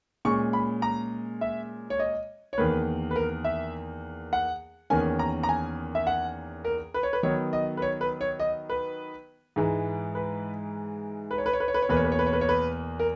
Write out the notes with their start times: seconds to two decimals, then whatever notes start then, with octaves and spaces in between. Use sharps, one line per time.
0.25 A#2 G#3 C#4 C#6
0.53 B5
0.82 A#5
1.41 E5
1.90 C#5
1.99 D#5
2.53 C#5
2.58 E2 D#3 A#3 B4
3.11 B4
3.16 A#4
3.44 E5
4.33 F#5
4.90 E2 D#3 A#3 C#4 G#5
5.19 A#5
5.43 A#5
5.49 G#5
5.95 E5
6.07 F#5
6.65 A#4
6.94 B4
7.03 C#5
7.13 B4
7.23 D#3 F#3 B3 D#4 C#5
7.53 D#5
7.77 B4
7.82 C#5
8.01 B4
8.21 C#5
8.40 D#5
8.70 B4
9.56 G#2 E3 G#3
10.15 B4
11.31 B4
11.38 C#5
11.46 B4
11.53 C#5
11.60 B4
11.68 C#5
11.74 B4
11.82 C#5
11.89 E2 B2 A#3 B4
11.96 C#5
12.05 B4
12.12 C#5
12.19 B4
12.26 C#5
12.33 B4
12.41 C#5
12.49 B4
12.99 A#4